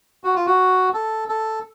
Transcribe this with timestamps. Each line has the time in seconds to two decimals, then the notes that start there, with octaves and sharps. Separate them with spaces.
0.24 F#4
0.35 F4
0.46 F#4
0.94 A4
1.28 A4